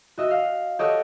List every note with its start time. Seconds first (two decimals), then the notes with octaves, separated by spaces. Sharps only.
0.18 F#4 D#5 E5
0.31 F5
0.79 G4 A4 C#5 D#5 F#5